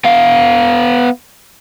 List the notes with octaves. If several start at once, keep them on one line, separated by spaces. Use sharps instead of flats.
B3 F5